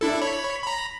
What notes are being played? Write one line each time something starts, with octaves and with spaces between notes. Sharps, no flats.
D4 E4 A4
C#5 B5
A#5 B5